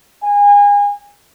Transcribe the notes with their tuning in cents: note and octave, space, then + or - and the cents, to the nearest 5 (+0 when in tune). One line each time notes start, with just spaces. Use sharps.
G#5 -30